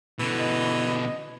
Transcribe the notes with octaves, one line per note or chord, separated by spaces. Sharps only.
B2 D3 E3
D#5